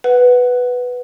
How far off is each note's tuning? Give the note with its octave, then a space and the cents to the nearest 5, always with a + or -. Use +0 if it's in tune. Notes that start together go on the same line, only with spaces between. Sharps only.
B4 +0 F#5 +0